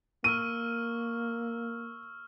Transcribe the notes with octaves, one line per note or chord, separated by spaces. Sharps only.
A#3 C#6 E6 F6 D#7